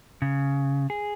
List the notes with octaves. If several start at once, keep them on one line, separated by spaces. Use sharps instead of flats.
C#3
G#4